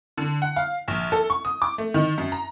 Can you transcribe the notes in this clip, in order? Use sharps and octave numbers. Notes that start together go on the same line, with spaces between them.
D3
F#5
F5
A#1
A4
C#6
D#6
D6
A3
D#3
F#2
A#5